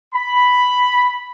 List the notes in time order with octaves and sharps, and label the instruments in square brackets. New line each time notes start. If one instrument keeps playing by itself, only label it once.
[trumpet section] B5